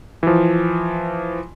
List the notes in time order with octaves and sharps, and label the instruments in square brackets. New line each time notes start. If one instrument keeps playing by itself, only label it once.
[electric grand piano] E3 F3